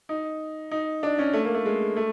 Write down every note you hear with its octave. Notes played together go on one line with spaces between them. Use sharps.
D#4
D#4
D4
C#4
A3
A#3
A3
G#3
A3